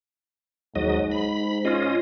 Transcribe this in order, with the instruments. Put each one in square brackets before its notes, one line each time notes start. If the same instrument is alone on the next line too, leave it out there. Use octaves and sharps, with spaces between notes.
[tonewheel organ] D#2 F#3 D#5 [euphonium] G#2
[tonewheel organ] B5
C#4 F4 D#5